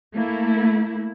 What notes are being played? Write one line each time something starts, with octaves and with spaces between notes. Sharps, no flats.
A3 A#3 E4